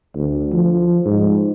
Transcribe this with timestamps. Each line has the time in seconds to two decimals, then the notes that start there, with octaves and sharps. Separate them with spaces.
0.16 D2
0.52 F3
1.06 G#2